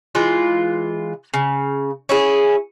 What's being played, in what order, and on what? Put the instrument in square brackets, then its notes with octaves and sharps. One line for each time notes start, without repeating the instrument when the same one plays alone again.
[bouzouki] E3 G#3 F4
C#3
C#4 E4 G#4